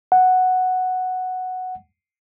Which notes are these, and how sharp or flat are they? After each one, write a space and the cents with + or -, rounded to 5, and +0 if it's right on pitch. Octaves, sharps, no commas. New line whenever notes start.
F#5 +0